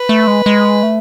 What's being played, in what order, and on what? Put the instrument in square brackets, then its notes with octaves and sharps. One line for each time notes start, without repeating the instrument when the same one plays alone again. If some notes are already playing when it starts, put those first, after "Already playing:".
Already playing: [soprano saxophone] B4
[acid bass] A3
G#3
G#3
A3